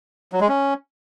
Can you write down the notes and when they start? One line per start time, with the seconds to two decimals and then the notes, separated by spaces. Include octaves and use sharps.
0.33 F#3
0.41 G#3
0.49 C#4